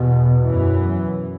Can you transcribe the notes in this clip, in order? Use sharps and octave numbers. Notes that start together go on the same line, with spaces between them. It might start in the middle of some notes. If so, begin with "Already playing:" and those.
Already playing: E2 B2
F#2 E3